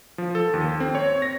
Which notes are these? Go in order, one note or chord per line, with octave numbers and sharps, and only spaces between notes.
F3
A4
D#2
C4
C#5
A#6